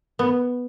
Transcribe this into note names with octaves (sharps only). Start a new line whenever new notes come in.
B3